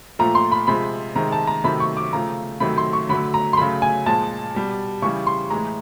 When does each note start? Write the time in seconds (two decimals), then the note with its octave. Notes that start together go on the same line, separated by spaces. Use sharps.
0.19 A#2 F3 A3 A#5
0.35 C6
0.52 B5
0.67 C3 F3 G#3 B5
1.15 C3 D#3 G#3 A#5
1.32 A5
1.47 A#5
1.64 C3 D#3 F#3 A3 B5
1.80 C#6
1.97 D6
2.13 C#3 F3 A3 A#5
2.60 C3 D#3 F#3 A3 B5
2.78 C6
2.93 C#6
3.09 D3 F#3 A3 B5
3.34 A#5
3.53 C6
3.57 C#3 F#3 A3 B5
3.82 G#5
4.06 A#2 F3 G#3 A5
4.55 B2 G3
5.02 C#3 E3 G3 C#6
5.27 C6
5.50 A2 E3 G#3 A#5